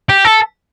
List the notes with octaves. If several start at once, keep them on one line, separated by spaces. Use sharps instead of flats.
G4
A4